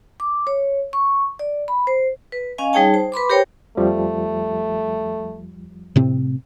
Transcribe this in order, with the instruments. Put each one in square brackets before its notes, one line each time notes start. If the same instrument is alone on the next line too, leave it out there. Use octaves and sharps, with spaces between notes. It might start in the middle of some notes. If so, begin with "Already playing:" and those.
[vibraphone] D6
C#5
C#6
D5
B5
C5
B4
C#4 D#5 F5 G#5
G3 D#4 G#4 C#5 G5 A5
C5
B4 B5 C6 D6
G4 A#4 C5 C#5 G5
[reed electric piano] F2 F3 G3 [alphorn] A3
[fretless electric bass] A2 C3 C4